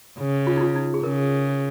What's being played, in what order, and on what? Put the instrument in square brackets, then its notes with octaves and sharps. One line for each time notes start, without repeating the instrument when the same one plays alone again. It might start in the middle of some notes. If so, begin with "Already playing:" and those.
[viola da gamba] C#3
[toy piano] F4
D#4
F4
D#4
G#4
[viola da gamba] C#3 [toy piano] A#4